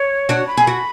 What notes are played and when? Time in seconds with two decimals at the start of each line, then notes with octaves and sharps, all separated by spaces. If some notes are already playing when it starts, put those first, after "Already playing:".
Already playing: C#5
0.29 D4 F#4
0.47 B5
0.57 G#4
0.67 F#4